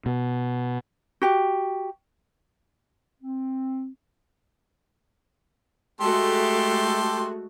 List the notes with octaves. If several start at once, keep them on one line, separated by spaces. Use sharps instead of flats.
B2
F#4 G4
C4
G#3 A3 F#4 G4 A4 C6